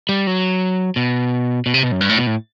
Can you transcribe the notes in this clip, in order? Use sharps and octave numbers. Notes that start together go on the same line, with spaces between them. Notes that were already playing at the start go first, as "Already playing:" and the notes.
G3
F#3
B2
B2
C3
B2
F#2
G2
A2
B2
A2